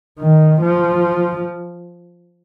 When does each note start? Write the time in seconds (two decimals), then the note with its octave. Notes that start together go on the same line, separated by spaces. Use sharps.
0.19 D#3
0.62 F3